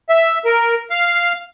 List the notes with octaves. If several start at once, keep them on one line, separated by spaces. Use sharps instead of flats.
E5
A#4
F5